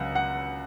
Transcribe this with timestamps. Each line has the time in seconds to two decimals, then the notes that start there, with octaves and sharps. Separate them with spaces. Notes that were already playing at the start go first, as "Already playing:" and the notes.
Already playing: C#2 F#3 F#5
0.15 F#5